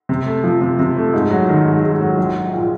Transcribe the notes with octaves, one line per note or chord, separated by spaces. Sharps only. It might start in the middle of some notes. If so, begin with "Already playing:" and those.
C3
A3
F3
C3
C3
A3
G#2
F#3
D#3
G#2
G#2
F#3
A#1
F#3
A#2